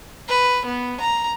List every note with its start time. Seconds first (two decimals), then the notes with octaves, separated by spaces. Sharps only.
0.28 B4
0.66 B3
1.00 A#5